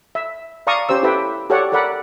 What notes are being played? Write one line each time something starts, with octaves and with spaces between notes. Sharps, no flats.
E5
D5 F5 A5 A#5 C#6 D#6
C#4 G4 C5 E6
E4 G4 A4 B4 E5 G5
G4 A4 C#5 D5 F#5
A4 A#4 D5 F#5 B5